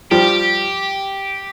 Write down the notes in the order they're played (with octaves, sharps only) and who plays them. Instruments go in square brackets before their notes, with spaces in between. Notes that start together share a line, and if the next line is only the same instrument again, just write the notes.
[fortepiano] F3 G3 [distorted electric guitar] G4